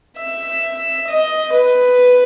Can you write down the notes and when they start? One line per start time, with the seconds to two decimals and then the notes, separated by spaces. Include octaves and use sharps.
0.18 E5
1.07 D#5
1.52 B4